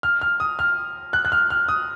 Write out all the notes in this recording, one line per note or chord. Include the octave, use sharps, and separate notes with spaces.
F6
F6
D#6
F6
F#6
F#6
F6
F6
D#6